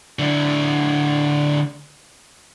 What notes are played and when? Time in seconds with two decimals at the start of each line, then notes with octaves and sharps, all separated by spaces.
0.19 D3 E4